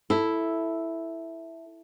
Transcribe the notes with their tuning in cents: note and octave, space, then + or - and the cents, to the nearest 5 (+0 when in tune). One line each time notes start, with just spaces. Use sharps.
E4 +0 A4 +0